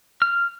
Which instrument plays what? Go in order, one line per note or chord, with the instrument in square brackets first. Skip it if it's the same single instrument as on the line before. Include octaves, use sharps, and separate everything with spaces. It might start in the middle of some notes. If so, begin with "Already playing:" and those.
[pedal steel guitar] F6